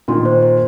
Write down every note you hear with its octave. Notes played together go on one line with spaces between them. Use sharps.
A#2 D#3 C6
C5
C5